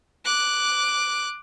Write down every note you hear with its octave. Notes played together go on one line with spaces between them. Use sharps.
D6 F#6